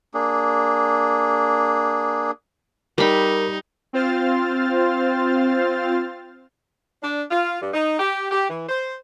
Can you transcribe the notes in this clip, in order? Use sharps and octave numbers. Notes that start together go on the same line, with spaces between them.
A#3 D4 G#4
G3 D#4 A#4 B5
C4 F4 C5 F6 A6
D4
F4
G2
D#4
G4
G4
E3
C5